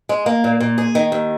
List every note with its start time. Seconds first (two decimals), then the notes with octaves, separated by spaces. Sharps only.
0.09 G#3
0.26 A#3
0.44 A#2
0.60 A#2
0.78 G#4
0.95 D#3
1.12 D#2